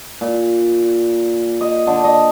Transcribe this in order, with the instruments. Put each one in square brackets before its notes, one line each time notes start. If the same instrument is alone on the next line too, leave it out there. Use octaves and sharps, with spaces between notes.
[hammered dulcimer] A#2
D#5
D3
D#5